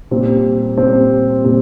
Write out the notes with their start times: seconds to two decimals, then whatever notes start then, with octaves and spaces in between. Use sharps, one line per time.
0.11 A#2 G3 C4
0.78 A#2 G3 C4
1.45 A#2 G3 C4